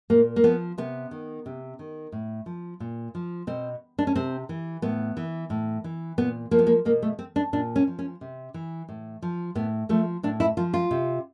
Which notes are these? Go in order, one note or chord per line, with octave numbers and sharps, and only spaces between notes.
A#2 A#3
A#3
F3 B3
C3 B3
D#3
C3
D#3
A2
F3
A#2
F3
B2 C4
D4
C#4
C3 C4
E3
A2 B3
E3
A2
E3
A#2 B3
F3 A#3
B3
A#3
B2 A#3
A3
C4
D4
A#2 D4
C#4
F3
C#4
C3
E3
A2
F3
A2 B3
F3 A3
A2 D4
E4
F3 F4
F4
C3